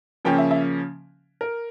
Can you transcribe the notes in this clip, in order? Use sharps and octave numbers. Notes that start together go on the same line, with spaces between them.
C#3 F3 A#3 C#4 G5
E5
E5
A#4